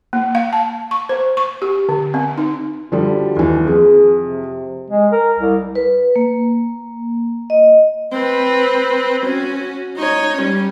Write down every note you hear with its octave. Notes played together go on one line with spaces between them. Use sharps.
A#3
F5
A5
C#6
C5
C#6
G4
D3
C4
D#4
D3 F3 G3 F#4
D#2 E3
F2 G#4
C3
G#3
A#4
C2
B4
A#3
D#5
C4 B4
C#4 F#4
D#4 C#5
G3 C#4